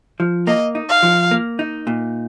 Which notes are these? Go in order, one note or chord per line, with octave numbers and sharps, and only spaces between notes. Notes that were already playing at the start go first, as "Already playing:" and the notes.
F3
A#3 D#5
D#4
F5
F3
A#3
D#4
A#2